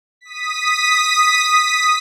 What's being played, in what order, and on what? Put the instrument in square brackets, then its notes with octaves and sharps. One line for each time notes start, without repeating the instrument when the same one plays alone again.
[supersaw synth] D#6 B6